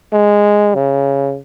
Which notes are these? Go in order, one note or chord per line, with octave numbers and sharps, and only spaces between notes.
G#3
C#3